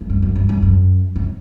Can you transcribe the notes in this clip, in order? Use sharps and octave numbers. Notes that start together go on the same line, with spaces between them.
G2
F#2
F#2
G2
F#2
F#2
F#2